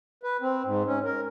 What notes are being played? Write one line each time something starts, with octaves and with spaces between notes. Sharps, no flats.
B4
C4
G#2
C#4
A#4